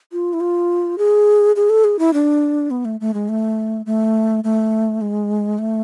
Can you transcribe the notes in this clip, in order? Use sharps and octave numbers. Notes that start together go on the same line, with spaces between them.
F4
E4
F4
G#4
G#4
A4
G#4
E4
D4
B3
A3
A3
G#3
A3
A3
A3
G#3
A3